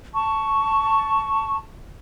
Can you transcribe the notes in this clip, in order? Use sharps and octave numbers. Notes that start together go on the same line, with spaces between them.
A5 C#6